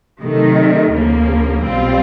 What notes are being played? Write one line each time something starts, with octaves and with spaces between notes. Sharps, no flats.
C3 D#3 F#3 A3
D2 C#3 F3 A#3
B1 B2 G3 C4 F4